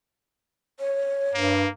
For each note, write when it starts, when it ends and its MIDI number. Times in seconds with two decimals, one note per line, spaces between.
0.80 1.52 73
1.34 1.67 43
1.34 1.69 58